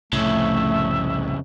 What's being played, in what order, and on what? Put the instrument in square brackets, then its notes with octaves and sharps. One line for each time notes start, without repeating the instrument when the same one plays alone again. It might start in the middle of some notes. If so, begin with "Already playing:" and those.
[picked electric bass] C2 A2 [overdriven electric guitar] F2 C#3 [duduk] A3 [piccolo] E5